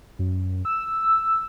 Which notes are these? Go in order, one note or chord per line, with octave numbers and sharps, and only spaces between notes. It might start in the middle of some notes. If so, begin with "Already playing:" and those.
F#2
E6
E6